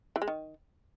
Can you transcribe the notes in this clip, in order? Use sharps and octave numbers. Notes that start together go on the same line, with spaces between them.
E3
G#3
D#3